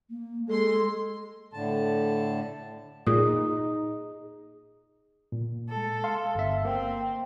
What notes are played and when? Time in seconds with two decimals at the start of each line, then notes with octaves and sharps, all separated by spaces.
0.10 A#3
0.48 G#3 A4 C6
1.53 A2 D3 A5
3.07 A#2 D#4 G#4 D#6
5.32 A#2
5.69 G#3 A4
6.04 F5 C6
6.35 G1 E5
6.65 A#3 C4